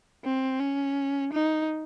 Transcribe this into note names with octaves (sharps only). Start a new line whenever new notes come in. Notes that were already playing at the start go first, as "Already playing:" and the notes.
C4
C#4
D#4